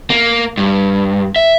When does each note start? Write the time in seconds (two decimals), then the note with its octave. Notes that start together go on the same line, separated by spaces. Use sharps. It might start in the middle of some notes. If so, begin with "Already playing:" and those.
0.10 A#3
0.58 G2
1.36 E5